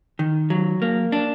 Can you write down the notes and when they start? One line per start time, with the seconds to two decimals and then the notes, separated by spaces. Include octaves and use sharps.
0.19 D#3
0.50 F#3
0.82 A#3
1.12 D4